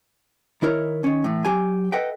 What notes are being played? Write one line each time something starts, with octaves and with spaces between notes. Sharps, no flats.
D#3 E4 A#4 C#5
D#3 C#4
A2 E3
F#3 G4 G#5
A4 B4 D#5 E5 F#5 G5